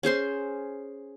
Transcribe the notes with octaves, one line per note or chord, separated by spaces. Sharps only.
C#4 G#4 C5 C6